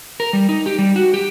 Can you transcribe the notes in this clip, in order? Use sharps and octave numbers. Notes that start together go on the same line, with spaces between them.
A#4
G3
D#4
G4
G3
F#4
G4